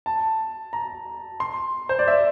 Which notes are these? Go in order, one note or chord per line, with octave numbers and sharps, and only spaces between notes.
A5
A#5
C6
C5
D5
E5